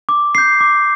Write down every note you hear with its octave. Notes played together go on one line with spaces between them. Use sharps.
D6
G6 C7
D6